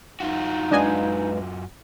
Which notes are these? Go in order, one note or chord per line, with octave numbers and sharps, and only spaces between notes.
F#2 D#4 F4 F#4
G#3 D4 B4 D#5 F5 G#5